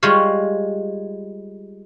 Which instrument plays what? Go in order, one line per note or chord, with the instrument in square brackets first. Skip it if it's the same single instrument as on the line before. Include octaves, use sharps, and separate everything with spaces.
[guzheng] G3 G#3 F4 C#5 F5